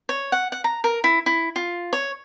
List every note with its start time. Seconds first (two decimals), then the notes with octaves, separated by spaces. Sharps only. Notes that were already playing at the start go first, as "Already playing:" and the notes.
0.09 C#5
0.32 F#5
0.52 F#5
0.64 A#5
0.84 A#4
1.04 E4
1.26 E4
1.56 F4
1.93 C#5